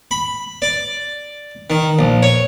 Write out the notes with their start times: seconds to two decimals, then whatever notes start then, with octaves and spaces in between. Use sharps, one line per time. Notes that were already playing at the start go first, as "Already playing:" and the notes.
0.11 B5
0.62 D5
1.70 D#3
1.99 A#1
2.23 C#5